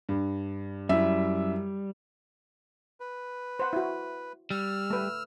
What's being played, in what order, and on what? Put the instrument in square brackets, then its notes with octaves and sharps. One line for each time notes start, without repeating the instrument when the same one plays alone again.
[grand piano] G2
[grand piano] F#2 E4 [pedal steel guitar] G3 [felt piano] E5
[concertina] B4
[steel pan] C5 F#5
E4 F#4
[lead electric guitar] G3 [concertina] E6 F6
[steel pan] A3 B4